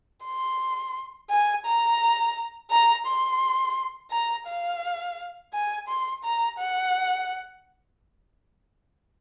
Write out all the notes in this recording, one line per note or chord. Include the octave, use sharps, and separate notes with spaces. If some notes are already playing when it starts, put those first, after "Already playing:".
C6
G#5
A#5
A#5
C6
A#5
F5
G#5
C6
A#5
F#5